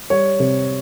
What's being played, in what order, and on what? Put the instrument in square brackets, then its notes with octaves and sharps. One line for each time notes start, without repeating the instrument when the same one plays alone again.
[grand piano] G3 C#5
C3